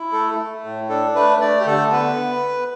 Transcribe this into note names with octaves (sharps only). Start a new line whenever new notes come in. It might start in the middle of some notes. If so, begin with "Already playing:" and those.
Already playing: E4
A3 A4
A3
A2
D4 A4
A3 B4
A3 D5
G4
D3 A4
B3 B4